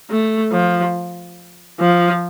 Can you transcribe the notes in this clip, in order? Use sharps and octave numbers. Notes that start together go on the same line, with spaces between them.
A3
F3
F3